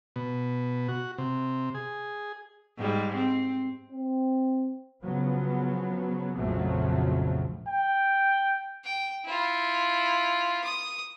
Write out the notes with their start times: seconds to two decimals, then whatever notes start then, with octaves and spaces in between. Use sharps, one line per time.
0.16 B2
0.88 F#4
1.18 C3
1.75 G#4
2.78 G#2 G3
3.16 C4
3.92 C4
5.03 C#3 F3 F#3 B3
6.35 A#1 F2 C#3 F3 F#3 A3
7.69 G5
8.84 G5
9.25 E4 F4
10.64 D#6